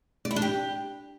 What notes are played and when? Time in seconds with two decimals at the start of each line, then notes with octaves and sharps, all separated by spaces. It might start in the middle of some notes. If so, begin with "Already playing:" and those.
0.25 D5
0.31 E4
0.36 D4
0.42 G4